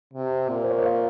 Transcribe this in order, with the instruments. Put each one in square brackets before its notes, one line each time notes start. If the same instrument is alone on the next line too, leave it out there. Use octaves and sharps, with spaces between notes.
[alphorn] C3
A#2
[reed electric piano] A#4
C5
C#5
D#5
F5